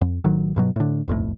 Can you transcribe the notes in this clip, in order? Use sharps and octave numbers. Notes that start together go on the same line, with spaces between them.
F2
A1 D#3 F#3
G2 B2 F#3
A2 D3
D#1 B1 F2 A2